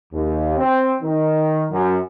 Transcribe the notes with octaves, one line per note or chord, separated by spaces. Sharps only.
D#2
C4
D#3
F#2